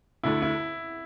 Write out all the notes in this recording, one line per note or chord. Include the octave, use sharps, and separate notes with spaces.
D2 D3 A3 E4
E4